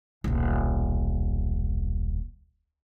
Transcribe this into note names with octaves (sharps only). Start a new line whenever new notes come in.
D#1 B1